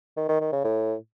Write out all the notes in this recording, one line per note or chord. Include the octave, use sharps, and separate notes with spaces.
D#3
D#3
D#3
C#3
A2